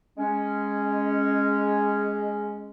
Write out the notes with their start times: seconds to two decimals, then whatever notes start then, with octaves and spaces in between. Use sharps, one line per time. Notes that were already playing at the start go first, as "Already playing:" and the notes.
0.18 G#3 C#4